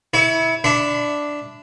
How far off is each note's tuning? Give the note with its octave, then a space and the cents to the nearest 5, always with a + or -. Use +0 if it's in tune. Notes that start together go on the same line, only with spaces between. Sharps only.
E4 -15 C#5 +30
D4 +0 E5 +0 B5 +30